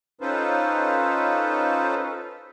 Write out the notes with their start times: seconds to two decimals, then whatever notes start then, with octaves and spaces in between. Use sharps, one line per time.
0.21 C#4 D#4 F4 A4 B4 C5